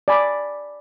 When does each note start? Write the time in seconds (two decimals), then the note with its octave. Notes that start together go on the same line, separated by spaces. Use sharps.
0.08 D5 G#5 B5